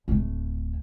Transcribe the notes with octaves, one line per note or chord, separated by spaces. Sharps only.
D1 A3